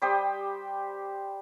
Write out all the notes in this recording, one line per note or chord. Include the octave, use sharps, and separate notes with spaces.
G3 G4 C5 D#6